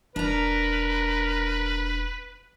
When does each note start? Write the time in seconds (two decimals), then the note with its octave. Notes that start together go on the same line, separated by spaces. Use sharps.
0.16 E1 D4 A#4 B4 A#5